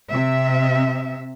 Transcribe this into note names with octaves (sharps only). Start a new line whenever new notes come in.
C3 E5